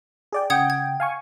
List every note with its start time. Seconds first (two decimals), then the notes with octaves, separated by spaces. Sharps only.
0.32 G#4 D5 G5
0.50 C#3 F#5 G5 D#6 G#6
0.70 G#6
1.00 F5 G#5 C#6